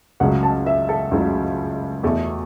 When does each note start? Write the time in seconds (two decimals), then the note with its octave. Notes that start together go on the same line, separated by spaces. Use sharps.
0.20 C#2 C#3 F#3 A3 F#5
0.43 A5
0.66 E5
0.89 A4
1.11 C#2 C#3 F#3 A3
2.03 E2 B2 A3